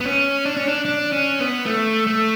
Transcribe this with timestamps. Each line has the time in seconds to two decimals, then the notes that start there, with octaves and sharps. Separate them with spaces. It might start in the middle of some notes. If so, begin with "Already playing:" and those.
0.01 B3
0.06 C#4
0.46 D4
0.57 C#4
0.68 D4
0.85 D4
1.12 C#4
1.40 B3
1.66 A3
2.07 A3